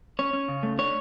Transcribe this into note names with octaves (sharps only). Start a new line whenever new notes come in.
C#4 C#5
C#4
C#3
A3
D4 C#5